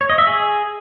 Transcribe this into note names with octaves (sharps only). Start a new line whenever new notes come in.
C#5
D#5
E5
G#4